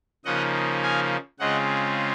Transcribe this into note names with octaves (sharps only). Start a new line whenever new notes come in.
C#3 F3 A#3 D#4 D#5 F#5
F5 G#5
C#3 G#3 C4 F4 D#5 F#5